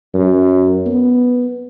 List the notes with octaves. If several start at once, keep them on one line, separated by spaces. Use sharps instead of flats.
F#2
B3